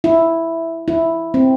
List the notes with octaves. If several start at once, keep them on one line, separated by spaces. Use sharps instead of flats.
E4
E4
C4